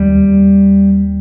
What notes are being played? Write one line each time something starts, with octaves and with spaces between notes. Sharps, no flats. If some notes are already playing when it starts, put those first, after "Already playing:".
Already playing: D#2 G3